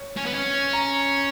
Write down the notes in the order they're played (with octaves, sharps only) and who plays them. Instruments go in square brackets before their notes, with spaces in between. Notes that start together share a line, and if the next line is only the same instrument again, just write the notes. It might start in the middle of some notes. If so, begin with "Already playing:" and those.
Already playing: [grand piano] C#5
[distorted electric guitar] C#4
B3
C#4
[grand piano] A#5